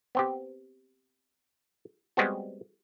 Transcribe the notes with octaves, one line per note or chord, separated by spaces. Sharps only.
B3 C4 G4
G3 G#3 B3 C4 F#4